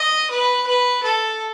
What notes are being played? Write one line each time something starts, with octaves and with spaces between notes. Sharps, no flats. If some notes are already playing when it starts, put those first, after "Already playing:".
Already playing: D#5
B4
B4
A4